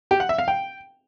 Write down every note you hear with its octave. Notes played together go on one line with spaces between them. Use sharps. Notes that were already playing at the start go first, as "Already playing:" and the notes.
G4
F#5
E5
F5
G5